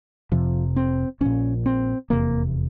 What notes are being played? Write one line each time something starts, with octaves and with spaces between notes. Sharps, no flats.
F1 F2 C3 F3
C4
A#1 A#2 C#4
C4
F1 E2 C3 A#3